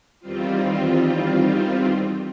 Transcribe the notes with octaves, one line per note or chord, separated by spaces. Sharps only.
E2 D#3 G3 C4 F4